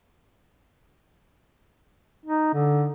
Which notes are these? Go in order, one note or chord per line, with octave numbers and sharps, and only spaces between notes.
D#4
D3